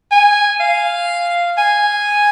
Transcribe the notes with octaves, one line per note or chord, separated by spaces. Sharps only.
G#5
F5
G#5